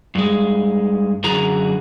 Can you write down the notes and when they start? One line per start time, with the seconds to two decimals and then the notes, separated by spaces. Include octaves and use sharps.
0.15 G2 G#3
1.24 F#2 D3 F#4 G#4 A#5